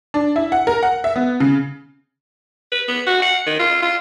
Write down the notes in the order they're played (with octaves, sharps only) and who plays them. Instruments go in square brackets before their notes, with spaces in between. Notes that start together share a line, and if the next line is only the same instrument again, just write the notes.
[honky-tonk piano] D4
E4
F#5
A#4
F#5
E5
B3
C#3
[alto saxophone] B4
B3
F#4
F#5
D#3
F4
F4